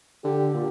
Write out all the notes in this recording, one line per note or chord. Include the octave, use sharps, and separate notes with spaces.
D3 G4
A#2